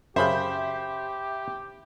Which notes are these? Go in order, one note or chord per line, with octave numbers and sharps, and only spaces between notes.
F#2 C#3 G4 C5 E5 B5 G6